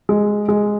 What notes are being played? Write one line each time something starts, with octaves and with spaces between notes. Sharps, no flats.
G#3
G#3